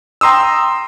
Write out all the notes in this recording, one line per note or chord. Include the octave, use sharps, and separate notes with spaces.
G5 A#5 C6 D#6 E6